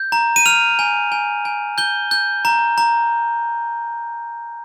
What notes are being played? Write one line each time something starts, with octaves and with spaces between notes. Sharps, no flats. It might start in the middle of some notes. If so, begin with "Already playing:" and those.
Already playing: G6
A#5
D#7
F6 F7
G#5
G#5
G#5
G6 G7
G6
A#5
A#5